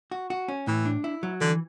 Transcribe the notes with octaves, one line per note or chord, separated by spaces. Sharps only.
F#4
F#4
C#4
A2 E3
D4
E4
F#3
D3 E3